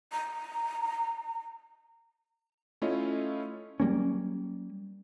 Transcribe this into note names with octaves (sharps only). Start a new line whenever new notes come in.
A#5
A3 C#4 E4 F4 C#5 D#5
F#3 G3 A#3 C#4